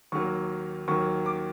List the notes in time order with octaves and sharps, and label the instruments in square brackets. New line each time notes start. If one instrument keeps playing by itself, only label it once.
[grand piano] D#2 D#3 F#3 A#3 C#6
D#2 D#3 F#3 A#3 C#6
D6